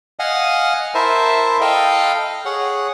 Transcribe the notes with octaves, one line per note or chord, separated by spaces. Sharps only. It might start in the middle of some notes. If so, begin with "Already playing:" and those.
D#5 F5 F#5 G#5
E4 A#4 C5 E5 A5
A4 D#5 F5 G5
G#4 C#5 F#5